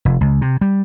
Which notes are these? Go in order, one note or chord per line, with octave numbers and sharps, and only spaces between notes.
F1
C#2
C3
G3